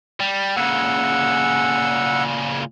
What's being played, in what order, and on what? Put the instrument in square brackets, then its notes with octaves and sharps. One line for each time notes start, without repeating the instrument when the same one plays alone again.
[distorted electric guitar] G3
[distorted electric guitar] A#2 C#3 [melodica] F#5 E6